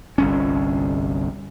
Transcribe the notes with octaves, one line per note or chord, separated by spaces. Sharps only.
G1 C2 C#4